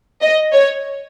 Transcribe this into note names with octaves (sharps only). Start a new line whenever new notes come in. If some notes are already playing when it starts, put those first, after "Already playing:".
D#5
C#5